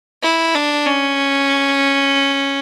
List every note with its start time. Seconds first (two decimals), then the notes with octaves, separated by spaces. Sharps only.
0.22 E4
0.55 D4
0.87 C#4